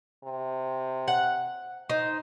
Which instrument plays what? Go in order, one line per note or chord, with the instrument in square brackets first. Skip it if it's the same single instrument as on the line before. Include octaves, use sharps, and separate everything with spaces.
[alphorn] C3
[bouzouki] F#5
D#4 C5